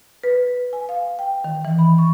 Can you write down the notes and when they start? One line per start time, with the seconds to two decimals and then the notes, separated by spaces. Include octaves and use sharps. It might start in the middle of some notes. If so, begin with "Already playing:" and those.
0.24 B4
0.73 G#5
0.89 F5
1.19 G5
1.44 D#3
1.65 E3
1.79 B5
1.98 C#6